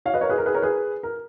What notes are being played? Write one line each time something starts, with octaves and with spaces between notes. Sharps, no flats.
C#5 F5
B4 D#5
A#4 C#5
G#4 B4
A#4
G#4 B4
A#4 C#5
G#4 B4
A#4